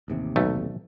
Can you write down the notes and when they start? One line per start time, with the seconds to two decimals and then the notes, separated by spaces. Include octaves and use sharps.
0.08 A1 D#2 C3
0.36 B1 A3